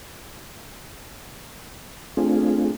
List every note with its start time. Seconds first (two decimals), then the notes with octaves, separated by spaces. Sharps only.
2.17 A3 C4 D4 F4 G#4